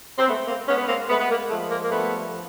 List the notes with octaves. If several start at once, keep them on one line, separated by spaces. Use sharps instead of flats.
C4
G#3 A3 B3
A#3 C4
G#3 B3 C#4
B3
A#3 C4
G#3 A3 B3
B3
A#3
F3 A3
A#3
A#3
G2 A3 B3